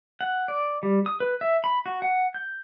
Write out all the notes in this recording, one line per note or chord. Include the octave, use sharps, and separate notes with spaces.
F#5
D5
G3
D#6
B4
E5
B5
F#4
F#5
G6